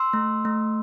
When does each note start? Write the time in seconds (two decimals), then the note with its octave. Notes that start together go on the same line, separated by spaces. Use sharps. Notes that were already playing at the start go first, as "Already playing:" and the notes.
Already playing: C6 E6
0.13 A3
0.45 A3